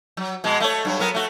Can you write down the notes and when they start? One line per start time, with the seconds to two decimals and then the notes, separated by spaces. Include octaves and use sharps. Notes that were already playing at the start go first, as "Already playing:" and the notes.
0.17 F#3
0.44 B2 G#3
0.60 A3 C#5
0.85 G2 F#3
0.99 F#3 B3 A#4
1.14 A3 F#4